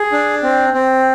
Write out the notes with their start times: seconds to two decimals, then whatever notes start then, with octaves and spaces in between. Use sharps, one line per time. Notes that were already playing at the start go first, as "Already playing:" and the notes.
Already playing: G#4
0.12 D4
0.43 C4
0.74 C4